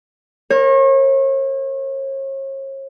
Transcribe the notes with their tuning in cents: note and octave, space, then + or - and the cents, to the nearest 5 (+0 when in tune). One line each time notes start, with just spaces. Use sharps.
A#4 +0 C#5 -40